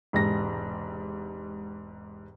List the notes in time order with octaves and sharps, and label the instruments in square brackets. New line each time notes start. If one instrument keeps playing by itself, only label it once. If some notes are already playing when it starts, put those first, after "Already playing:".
[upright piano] E1 G#2 C3 A#6